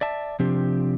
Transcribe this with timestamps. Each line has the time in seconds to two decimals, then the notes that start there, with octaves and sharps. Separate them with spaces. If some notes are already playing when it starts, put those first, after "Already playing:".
0.01 D5 E5 A5
0.40 C3 F3 C4 D4 G4